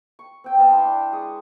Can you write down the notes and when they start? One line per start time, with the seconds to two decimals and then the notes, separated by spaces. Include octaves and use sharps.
0.19 C#6
0.44 C4 G5
0.57 B3 F5 A5 C6
0.71 E4 E5 C6
0.83 D4
1.13 G#3 C#6 D#6